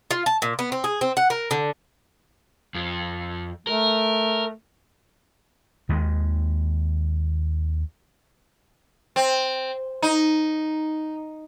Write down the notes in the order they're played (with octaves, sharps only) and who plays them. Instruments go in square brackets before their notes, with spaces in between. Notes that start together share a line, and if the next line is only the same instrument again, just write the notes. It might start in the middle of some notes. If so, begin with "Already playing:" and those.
[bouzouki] F4
A5
A#2
B3
C4
G#4
C4
F#5
A#4
D3
[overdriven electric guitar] F2
[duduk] A3 [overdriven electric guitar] A#4
[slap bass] D#2 D#3 E3 G#3
[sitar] C4
D#4